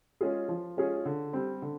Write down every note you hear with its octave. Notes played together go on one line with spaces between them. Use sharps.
G#3 C#4 F4 G#4
F3
G#3 C#4 F4 G#4
D3
G3 C4
D3